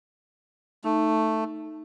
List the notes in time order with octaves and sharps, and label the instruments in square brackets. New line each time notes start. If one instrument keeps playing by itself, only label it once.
[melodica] A3 [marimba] D#4